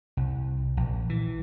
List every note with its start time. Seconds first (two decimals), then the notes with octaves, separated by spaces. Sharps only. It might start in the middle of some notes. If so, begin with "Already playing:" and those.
0.17 C2
0.77 A#1
1.10 E3